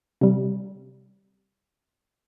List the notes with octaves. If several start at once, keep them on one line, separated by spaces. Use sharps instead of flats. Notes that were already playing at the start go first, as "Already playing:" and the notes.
C3 G3